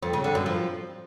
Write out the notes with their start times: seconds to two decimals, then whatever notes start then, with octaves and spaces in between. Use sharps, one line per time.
0.02 F2
0.13 C#3
0.24 D3
0.35 F#2
0.46 F3